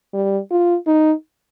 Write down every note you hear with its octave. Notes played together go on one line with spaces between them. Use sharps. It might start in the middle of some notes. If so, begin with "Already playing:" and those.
G3
F4
D#4